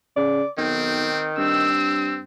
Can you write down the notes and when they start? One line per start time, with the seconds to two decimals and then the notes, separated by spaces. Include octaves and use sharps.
0.17 C#3 D5
0.58 B1 D#3 C4
1.38 G2 C4 E6